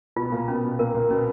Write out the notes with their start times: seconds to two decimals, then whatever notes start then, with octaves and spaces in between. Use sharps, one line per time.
0.16 B2 B3 F4
0.32 A#2 A#3
0.48 B2 B3 C#4
0.63 B2 B3
0.79 A#2 A#3 A#4
0.94 A#2 A#3
1.10 B2 B3 C#4